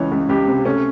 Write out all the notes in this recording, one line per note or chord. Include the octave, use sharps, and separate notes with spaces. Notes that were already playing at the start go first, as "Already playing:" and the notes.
Already playing: C#2 E3 C#5
C#2
C#2 G4
C3
A3 C#4